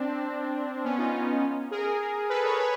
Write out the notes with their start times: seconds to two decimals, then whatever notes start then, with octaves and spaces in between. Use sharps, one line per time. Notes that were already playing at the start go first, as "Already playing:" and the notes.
Already playing: C4 D4
0.84 B3 C#4
0.98 D#4 F4
1.71 G#4 A#4
2.30 A4 B4
2.45 B4 C#5
2.60 B4 C#5